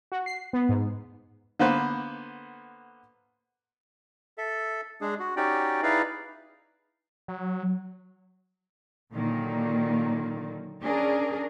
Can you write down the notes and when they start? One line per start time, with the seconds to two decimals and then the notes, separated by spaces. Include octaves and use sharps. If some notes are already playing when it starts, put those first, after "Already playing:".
0.12 F#4
0.26 C7
0.53 B3
0.69 G#2
1.59 D3 A#3 B3 B4 C5
4.38 A4 E5
5.01 G#3 D4 G#4
5.19 F#4
5.37 C#4 D#4 F#4 G4 D5 G5
5.83 D#4 E4 G#4 B4 D5 F5
7.28 F#3
9.12 A#2 D3 D#3 F#3 A#3
10.82 C#4 D4 G#4 A#4